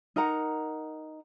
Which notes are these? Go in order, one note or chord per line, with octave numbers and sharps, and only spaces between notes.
D#4 A#4 F#5 A#5